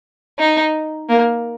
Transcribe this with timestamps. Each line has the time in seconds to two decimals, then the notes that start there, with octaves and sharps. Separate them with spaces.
0.39 D#4
1.09 A#3